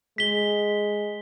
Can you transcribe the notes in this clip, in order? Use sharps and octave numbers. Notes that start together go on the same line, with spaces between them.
G#3 B6 G7